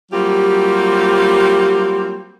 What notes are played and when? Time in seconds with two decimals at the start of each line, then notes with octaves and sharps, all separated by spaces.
0.12 F#3 G3 A#3 C4 F4 G4